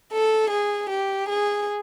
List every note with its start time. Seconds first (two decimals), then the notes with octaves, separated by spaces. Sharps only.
0.10 A4
0.48 G#4
0.88 G4
1.26 G#4